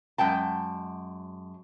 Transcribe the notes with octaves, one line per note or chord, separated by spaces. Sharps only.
F#2 G#3 G5 A5